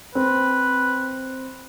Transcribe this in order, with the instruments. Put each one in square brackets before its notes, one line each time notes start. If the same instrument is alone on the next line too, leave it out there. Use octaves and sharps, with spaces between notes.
[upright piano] C4 [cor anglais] B4